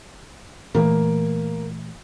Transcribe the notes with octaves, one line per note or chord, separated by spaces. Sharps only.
A#2 E3 A3 A#3